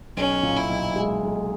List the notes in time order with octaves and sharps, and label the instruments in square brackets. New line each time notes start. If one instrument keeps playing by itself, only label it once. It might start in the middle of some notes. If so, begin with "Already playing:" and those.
[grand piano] B1 [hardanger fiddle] C#4
[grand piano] A#2
[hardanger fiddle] E4
[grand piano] B1
G#3
B1